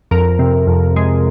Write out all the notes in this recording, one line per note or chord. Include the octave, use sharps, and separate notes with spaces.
F2 A#4
C3
F2
G#3